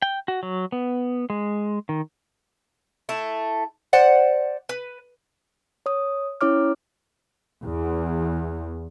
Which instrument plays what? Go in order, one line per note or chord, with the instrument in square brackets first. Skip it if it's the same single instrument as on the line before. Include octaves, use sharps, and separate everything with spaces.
[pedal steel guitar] G5
F#4
F#3
B3
G#3
D#3
[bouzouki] A3 E4 A5
C5 D5 F#5
B4
[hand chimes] C#5 D#6
C#4 E4 C#5 D6 F6
[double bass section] E2